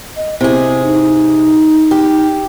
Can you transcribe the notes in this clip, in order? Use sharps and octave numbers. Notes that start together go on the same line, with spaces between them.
D#5
C3 E4 G#4
D#4
G4